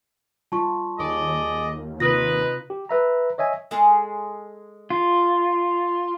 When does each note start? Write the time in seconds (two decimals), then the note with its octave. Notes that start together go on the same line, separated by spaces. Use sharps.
0.52 G3 F4 A5 C#6
0.99 D#2 G#4 D5 D#5
2.00 C3 D#4 F4 B4 D#6 A#6
2.70 G4
2.89 B4 E5 A#5
3.38 C#5 D#5 E5 G#5
3.71 G#3 G#4 A4
4.90 F4